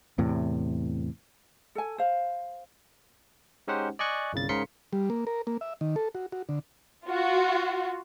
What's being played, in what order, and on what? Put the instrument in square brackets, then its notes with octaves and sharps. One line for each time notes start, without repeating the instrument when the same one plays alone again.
[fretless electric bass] E2 A2 C3
[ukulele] A4 G#5
C5 F5
[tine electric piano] G#3 C#4 D#4 G4 C5 F#5
D5 D#5 G#5 C#6 F#6
G1 C2 C#3 A6
G#2 C#3 A#4 C6 B6 C#7
[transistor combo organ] G3
A#3
A#4
A#3
E5
D#3
A4
F#4
F#4
D3
[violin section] F4 F#4